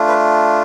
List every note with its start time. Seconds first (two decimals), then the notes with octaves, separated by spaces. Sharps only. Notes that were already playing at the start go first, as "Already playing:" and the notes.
Already playing: A3 D4 F4
0.08 B4